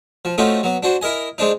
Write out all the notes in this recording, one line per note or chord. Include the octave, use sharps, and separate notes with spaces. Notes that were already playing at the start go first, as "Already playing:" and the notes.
F3
A3 C4 C#4 D#4 F4 F#4
F#3 B3
D4 F#4 C5
E4 A#4 D#5 G#5
G#3 C4 D4 D#4